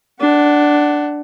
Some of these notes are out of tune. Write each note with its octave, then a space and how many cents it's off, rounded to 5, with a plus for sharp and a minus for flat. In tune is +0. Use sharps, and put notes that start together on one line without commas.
D4 +0 F#5 +20